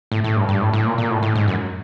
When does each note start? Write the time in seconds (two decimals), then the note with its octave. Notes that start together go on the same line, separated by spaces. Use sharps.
0.12 A2
0.24 A2
0.37 G2
0.49 G2
0.61 A2
0.74 A2
0.86 A#2
0.98 A#2
1.10 A2
1.23 A2
1.35 G#2
1.48 F#2